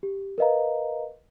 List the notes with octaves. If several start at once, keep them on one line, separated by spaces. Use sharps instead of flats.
G4
A#4 B4 D#5 F5 A#5